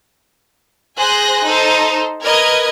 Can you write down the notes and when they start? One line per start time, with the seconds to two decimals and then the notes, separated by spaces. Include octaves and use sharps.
0.98 G#4 C5 G#5 F#6 A#6
1.47 D#4 A4 C5
2.23 A#4 B4 D#5 G#6